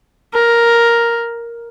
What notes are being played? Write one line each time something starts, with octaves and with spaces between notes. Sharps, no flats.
A#4